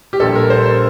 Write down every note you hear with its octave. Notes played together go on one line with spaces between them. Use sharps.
G4
A#1 A#2 G3 A4
A#4
C5
C5